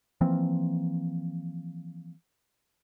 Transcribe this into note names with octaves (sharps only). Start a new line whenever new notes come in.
E3 F3 A#3 C4